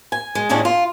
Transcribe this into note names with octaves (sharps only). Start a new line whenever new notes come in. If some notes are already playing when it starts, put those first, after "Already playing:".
G#5
G#3
D#2 A2 G#3 C#4 D4 E4
F4